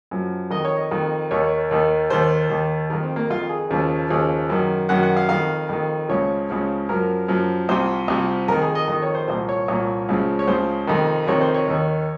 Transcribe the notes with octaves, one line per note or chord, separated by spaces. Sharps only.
F#2 F3
F2 D#3 D#5
C#5
D#5
F2 D#3
D#2 D#3 C#5
D#2 D#3
D#2 D#3 C5
D#2 D#3
F2 D#3 A#4
C4
A#3
F2 D#3 F4
G#4
D#2 C#3 F3
D#2 C#3 F3 G#4
F#2 D#3
F#2 D#3 F#5
F#5
F5
F2 D#3 F5
F2 D#3
C#2 C#3 F3 C#5
C#2 C#3 F3
F#2 F3 A#4
F#2 F3
C2 C3 F3 C5
C2 C3 F3
F2 D#3 A#4
G#4
D#5
F2 D#3 D#5
C#5
C5
C2 A#2 F3 C5
C#5
C2 A#2 F3 C#5
C#2 C#3 F3
C#5
C#2 C#3 F3 C5
F2 C3 D#3
F2 C3 D#3 C#5
C5
C#5
D#2 D#3